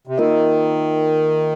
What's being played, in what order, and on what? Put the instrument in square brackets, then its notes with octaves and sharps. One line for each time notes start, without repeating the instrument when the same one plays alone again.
[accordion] C3
[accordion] D#3 [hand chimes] A#3 F4 A#4 D#5